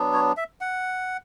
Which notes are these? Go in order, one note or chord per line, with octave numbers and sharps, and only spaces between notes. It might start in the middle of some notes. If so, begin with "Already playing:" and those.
Already playing: F#3 B3 D4
C#5
E5
F#5